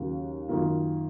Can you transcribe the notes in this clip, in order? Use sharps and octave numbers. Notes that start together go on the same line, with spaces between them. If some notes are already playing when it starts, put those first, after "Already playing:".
Already playing: D#2 C#3 F#3 A#3
F#2 D#3 A#3 F4